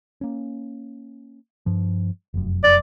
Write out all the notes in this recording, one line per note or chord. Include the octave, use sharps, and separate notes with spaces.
A#3 C#4
G2 F3
F1 F#2
D5